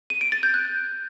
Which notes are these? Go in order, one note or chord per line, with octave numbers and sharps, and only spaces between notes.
D#7
D7
A6
G6
F#6